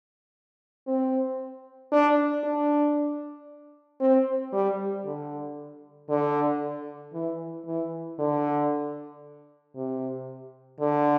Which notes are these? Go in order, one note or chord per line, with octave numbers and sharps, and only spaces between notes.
C4
D4
D4
C4
G3
D3
D3
E3
E3
D3
C3
D3